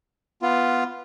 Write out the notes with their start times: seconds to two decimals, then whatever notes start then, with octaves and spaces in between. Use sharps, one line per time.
0.42 B3 F4